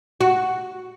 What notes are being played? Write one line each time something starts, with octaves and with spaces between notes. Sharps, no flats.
F#4